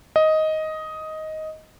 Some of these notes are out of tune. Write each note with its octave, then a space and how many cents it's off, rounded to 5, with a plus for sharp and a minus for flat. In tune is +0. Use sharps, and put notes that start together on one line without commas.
D#5 +10